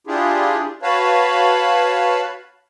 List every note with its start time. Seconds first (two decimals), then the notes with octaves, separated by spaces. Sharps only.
0.07 D4 E4 F4 G4 G#4
0.82 F#4 B4 C#5 F5 A5 B5